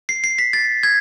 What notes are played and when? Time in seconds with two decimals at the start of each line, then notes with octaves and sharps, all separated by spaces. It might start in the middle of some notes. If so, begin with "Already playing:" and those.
0.09 C7
0.24 C7
0.38 B6
0.53 A6
0.83 G#6